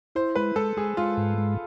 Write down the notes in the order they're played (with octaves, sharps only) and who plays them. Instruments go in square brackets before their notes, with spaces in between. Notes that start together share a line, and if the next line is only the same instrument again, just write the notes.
[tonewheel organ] E4 [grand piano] C5
[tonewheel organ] G#3 [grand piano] B4
[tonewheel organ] G#3 [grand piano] A4
[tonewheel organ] G#3 [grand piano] G#4
[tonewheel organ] G#3 [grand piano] F4
[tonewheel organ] G#2
G#3